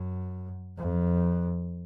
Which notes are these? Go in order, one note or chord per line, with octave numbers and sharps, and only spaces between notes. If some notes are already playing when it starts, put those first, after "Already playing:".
Already playing: F#2
F2